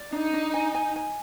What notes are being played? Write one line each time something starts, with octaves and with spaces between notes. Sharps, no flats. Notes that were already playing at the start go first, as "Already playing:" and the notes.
Already playing: D5
D4 D#4
D4
G#5
G#5
G#5